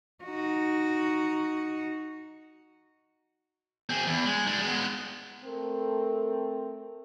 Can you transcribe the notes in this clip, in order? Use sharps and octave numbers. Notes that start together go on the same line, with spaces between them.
D#4 F#4
C4 G#4
E2
G#3
G#3 D4
G#3 B3
A3 C4 A4 A#4